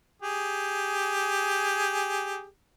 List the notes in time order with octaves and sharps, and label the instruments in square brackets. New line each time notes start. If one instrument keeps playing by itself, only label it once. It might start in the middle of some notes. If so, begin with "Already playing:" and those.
[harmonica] G4 G#4